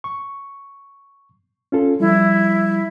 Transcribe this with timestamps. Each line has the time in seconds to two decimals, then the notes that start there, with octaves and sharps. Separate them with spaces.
0.04 C#6
1.72 C#4 F4 A4
2.00 F3 G3 E4